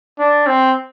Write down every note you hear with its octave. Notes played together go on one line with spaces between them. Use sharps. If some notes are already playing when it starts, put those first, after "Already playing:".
D4
C4